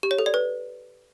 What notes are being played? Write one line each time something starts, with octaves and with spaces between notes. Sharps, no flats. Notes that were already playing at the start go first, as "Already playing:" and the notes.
G4
C#5
A4
D5
B4